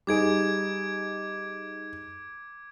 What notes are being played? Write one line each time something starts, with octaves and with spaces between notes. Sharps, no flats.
G3 D#4 G#4 D6 G#6 D7